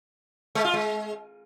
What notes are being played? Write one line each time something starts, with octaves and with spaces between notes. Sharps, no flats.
G#3
F4
G#3